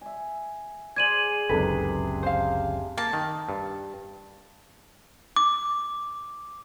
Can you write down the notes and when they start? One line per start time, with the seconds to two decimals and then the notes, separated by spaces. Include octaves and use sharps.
0.01 E5 G#5
0.96 G#4 C5 D5 G#6 D#7 F#7
1.49 G1 C#2 F#2 C3 D4 D#4 A4 B4
2.23 C5 F5
2.98 A#3 A5
3.13 D#3
3.49 G2
5.36 D6